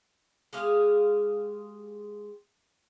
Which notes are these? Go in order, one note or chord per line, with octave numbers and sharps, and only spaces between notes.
G#3 G4 G#4 F5